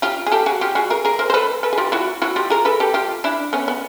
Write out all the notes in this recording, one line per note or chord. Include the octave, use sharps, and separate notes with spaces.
F4 G4
G#4
G4 A4
F#4 G#4
F4 G4
F#4 G#4
G#4 A#4
G#4 A#4
A#4 C5
C5
A4 B4
A4 B4
G#4
F4 G4
E4 F#4
E4 F#4
F4 G4
G#4 A#4
A4 B4
G4 A4
F4 G4
D4 E4
B3 C#4
B3